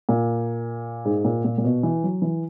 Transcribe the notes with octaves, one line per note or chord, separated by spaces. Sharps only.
A#2
G#2
A#2
A#2
A#2
B2
E3
F#3
E3